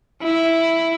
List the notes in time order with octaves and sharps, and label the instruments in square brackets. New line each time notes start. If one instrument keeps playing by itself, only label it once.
[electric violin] E4